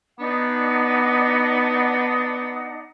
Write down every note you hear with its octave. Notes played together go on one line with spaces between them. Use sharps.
B3 D4 D#4 F#5